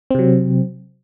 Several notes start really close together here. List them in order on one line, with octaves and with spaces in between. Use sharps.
C4 C3 F#3